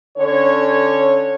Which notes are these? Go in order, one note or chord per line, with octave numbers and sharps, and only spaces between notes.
D3 C#4 A4 C#5